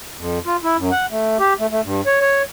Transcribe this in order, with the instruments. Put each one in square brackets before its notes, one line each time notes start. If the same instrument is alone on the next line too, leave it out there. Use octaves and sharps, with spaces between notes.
[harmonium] F2
F4
E4
F#2
F#5
A3
G4
A3
A3
G2
C#5
C#5